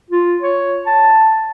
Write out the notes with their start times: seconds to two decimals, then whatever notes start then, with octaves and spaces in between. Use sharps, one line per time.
0.11 F4
0.42 C#5
0.86 A5